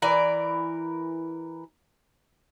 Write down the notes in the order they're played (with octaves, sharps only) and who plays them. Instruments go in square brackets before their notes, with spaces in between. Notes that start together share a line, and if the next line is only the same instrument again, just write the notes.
[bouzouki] E3 A#4 D5